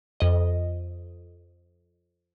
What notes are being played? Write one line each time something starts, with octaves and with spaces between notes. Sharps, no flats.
F2 D#5